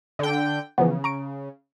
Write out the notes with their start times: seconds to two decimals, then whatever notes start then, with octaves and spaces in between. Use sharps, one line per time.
0.19 D3 G5
0.78 C#3 E3 F3 B3
1.04 A#5 C#6 D7